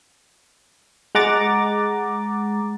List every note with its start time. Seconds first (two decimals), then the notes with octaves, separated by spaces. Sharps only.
1.15 G#3 F#5 A#5 D6 A6